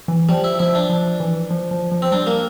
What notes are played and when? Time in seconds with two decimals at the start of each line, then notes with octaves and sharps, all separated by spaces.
0.08 E3
0.29 F3 G3
0.44 E4
0.59 F3 E4
0.75 D4
0.90 F3
1.20 E3
1.51 F3
1.71 F3
1.92 F3
2.02 C4
2.12 G3 D4
2.27 A#3